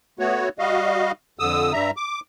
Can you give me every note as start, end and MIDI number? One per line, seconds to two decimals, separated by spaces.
0.19 0.49 57
0.19 0.49 59
0.19 0.49 66
0.19 0.49 73
0.59 1.12 55
0.59 1.12 66
0.59 1.12 75
0.59 1.12 77
1.39 1.73 41
1.39 1.73 50
1.39 1.73 87
1.39 1.73 88
1.73 1.91 43
1.73 1.91 55
1.73 1.91 76
1.73 1.91 82
1.96 2.20 86